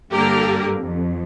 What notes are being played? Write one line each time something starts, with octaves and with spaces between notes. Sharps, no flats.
G2 D3 A#3 G4 A#4
F2